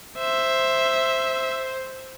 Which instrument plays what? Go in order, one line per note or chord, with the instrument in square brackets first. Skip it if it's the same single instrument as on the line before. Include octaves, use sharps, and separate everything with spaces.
[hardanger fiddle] C5 [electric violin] E5